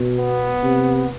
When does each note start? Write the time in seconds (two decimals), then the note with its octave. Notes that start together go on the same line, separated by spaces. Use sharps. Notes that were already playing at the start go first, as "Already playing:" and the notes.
Already playing: B2
0.18 B3
0.63 C3